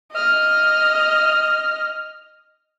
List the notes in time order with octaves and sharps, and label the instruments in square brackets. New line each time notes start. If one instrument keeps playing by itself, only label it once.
[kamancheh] D#5 F6